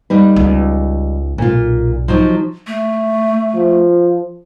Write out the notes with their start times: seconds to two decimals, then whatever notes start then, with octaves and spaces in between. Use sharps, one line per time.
0.10 G3 D#4 B4
0.36 C#2
1.38 B1 A#2 F4
2.08 F3 F#3 D#4
2.67 A3
3.56 F3